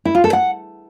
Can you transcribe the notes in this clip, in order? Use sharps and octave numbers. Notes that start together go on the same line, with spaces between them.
E4
F4
A4
F#5